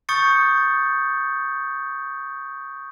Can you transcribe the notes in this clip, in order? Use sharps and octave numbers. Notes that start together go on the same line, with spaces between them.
C#6 D#6 G6 A6 C#7